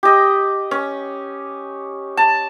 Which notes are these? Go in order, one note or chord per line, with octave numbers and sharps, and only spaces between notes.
G4 D#5
C#4
A5